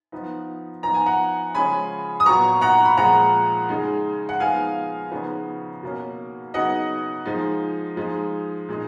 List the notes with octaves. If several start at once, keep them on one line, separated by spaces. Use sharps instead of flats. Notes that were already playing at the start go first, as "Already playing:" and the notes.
F3 B3 D#4
F3 B3 D#4 A#5
G#5
F#5 A#5
C#3 F3 G#3 C#4 G#5 B5
D#6
A#2 F#3 B3 A#5 C#6
F#5 A#5
B5
A#2 F3 G#3 F#5 A#5
C#3 G#3 D#4
F#5
F3 G#3 B3 D#4 F5 G#5
C#3 F3 B3 D#4
B2 A#3 C#4
C#3 F#3 B3 D#4 D#5 F#5
F3 G#3 D#4
F3 G#3 D#4
A#2 G#3 D#4